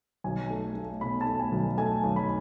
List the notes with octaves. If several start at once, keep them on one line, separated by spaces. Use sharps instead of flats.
B1 G#5
A3
A3
B2 B5
A5
A3
G#5
B1
A3 G#5
B1
B5